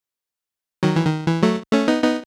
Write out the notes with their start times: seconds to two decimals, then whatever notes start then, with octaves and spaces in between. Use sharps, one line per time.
0.83 D#3 F#3
0.96 E3
1.05 D#3
1.27 E3
1.43 F#3 A3
1.73 A3 C#4
1.88 B3 D#4
2.02 B3 D#4